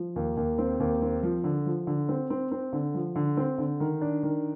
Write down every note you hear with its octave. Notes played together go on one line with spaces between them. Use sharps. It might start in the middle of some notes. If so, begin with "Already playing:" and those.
Already playing: F3
D#2
D#2
C4
D#2
C4
F3
D3
F3
D3
C4
C4
C4
D3
F3
D3
C4
D3
D#3
D4
D#3